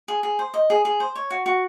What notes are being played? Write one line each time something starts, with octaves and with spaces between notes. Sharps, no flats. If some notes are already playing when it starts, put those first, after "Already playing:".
G#4
G#4
C5
D#5
G#4
G#4
C5
C#5
F#4
F#4